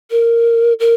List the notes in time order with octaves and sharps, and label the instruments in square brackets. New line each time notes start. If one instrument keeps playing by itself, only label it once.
[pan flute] A#4
A#4